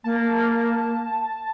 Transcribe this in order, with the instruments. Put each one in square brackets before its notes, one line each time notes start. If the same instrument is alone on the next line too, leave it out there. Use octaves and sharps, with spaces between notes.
[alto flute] A#3 [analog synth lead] A5